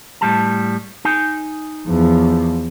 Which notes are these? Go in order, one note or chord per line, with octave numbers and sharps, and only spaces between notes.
A2 G3 A5
D#4 G#5
E2 F3